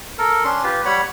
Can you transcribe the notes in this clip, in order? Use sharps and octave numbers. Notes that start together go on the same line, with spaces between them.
A4 A#4
C#4 D4 C6
F4 G4 B4
G3 C#5 F#5 B5